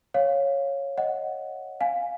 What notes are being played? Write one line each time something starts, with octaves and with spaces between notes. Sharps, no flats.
C#5 F5
D#5 F#5
F5 G#5